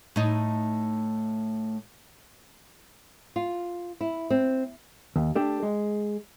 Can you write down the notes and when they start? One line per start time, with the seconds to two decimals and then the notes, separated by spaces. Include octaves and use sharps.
0.16 A2 D#4
3.36 F4
4.01 E4
4.30 C4
5.16 D#2
5.36 A3 D4 G4
5.63 G#3